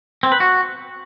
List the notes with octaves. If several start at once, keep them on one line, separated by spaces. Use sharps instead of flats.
C4
B4
F#4